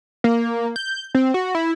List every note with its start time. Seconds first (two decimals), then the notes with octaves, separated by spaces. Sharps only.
0.24 A#3
0.76 G6
1.15 C4
1.34 F#4
1.55 E4